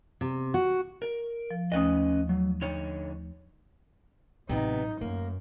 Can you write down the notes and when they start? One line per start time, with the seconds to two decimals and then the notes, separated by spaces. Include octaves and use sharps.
0.21 C3
0.54 F#4
1.02 A#4
1.51 F3
1.72 D#2 A3 C#4 B4 D#5 D#6
2.29 F#3
2.62 D3 D#4 C#5
4.49 A1 C3 F#3 B3 D#4
5.01 F#2 A3 A#3